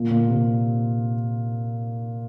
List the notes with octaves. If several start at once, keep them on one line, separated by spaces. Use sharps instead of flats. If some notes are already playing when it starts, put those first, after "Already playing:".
Already playing: A#2
A#2
C3